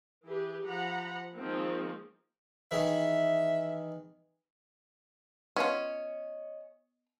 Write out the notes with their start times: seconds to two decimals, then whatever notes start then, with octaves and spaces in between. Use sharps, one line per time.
0.24 E3 G4 G#4 B4
0.63 F3 F#5 A#5 B5
1.35 D#3 F3 G#3 A#3 C4
2.71 D#3 E3 G#4 E5
5.56 B3 C#4 F4 D#5